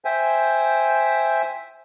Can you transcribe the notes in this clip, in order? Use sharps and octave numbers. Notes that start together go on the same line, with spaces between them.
C5 E5 G5 G#5